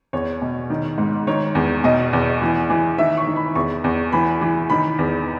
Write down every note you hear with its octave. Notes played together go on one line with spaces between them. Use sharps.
E2 C#5
B2
D#3
G#2
D#3 C#5
E2
B2 D#5
E2
E3
E3
D#3 E5
C#6
D#3
B5
E2 C#6
E2
E3 B5
E3
D#3 B5
E2